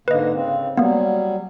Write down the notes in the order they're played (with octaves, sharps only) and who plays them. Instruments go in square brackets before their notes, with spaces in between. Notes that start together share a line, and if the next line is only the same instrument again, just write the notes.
[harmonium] G#2 D3 A#3 [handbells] B4 D#5
[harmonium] C#3 C4
[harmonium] F#3 G3 [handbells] A#3 B3